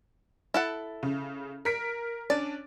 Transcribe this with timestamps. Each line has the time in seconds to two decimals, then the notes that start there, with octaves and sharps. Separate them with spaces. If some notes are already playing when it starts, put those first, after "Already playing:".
0.54 E4 A4 F#5
1.03 C#3
1.65 A#4 B6 D7
2.30 C#4 D4 D5